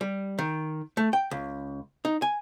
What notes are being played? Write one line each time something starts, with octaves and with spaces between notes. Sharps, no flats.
G3
D#3
A3
G5
C#2
D#4
G#5